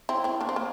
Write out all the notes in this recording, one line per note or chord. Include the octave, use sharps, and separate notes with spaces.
C4 E4
C4 E4
A#3 D4
C4
A#3